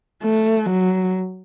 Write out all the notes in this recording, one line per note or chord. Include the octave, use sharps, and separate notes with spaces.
A3
F#3